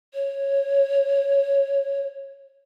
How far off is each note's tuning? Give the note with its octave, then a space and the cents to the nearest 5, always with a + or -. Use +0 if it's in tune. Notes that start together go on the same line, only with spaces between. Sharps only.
C#5 -10